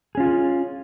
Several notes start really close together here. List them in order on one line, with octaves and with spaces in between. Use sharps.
G#4 C#4 F4